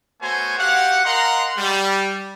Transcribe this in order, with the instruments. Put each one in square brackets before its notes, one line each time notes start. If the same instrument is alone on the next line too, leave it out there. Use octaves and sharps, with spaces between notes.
[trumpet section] A3 B3 F#4 C5 C#5 G#5
F#4 G4 F5 F#5
A#4 D#5 F5 F#5 A#5 C6
G3